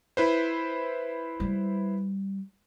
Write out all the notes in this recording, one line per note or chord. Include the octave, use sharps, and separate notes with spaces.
E4 B4 C5
G3